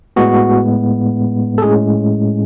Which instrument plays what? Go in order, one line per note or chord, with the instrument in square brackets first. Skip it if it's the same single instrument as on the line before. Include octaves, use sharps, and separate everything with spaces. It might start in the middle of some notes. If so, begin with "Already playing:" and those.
[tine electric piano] A2 G#3 B3 F#4
A4
A2 G#3 C#4 G#4